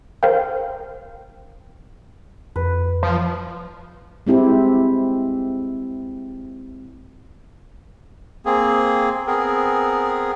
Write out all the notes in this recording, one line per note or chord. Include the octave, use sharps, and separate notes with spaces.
A#4 C5 F5 G5
F2 B4
F3
G#3 C4 E4 G4
A#3 C4 G#4
B3 C4 G#4 A#4